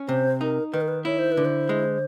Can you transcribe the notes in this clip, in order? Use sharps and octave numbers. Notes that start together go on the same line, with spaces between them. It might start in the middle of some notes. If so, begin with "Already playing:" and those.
Already playing: C#4
C3 C5
D#4 A#4
D#3 B4
A#4
B4
E4 C#5
C5
B4
D3
C5
G#3